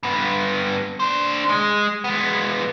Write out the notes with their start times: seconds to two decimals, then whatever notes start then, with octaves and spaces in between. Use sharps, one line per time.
0.03 G2 B3
1.00 D4 C5
1.50 G#3
2.04 G#3 B3